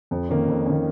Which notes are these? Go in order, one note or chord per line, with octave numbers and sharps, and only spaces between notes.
F2
D#3 A#3 C#4
F2
D#3 A#3 C#4